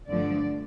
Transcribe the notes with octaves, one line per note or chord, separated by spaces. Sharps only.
G2 D3 F3 A3 D5